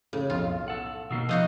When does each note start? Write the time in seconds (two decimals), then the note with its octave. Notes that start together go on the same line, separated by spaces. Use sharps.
0.13 A2 C#3
0.30 B1 F2 F4
0.68 A4 F#5
1.11 B2 D#3 A#3 E6 C7
1.29 F3 B3 D#4 F#4 D#5 F5